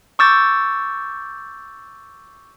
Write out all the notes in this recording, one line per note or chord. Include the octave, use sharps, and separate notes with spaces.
C#6 D6 E6 G6 A6